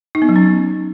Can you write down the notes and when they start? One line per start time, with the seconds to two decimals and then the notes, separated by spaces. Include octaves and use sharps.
0.15 D#4
0.22 B3
0.29 F#3
0.36 C#4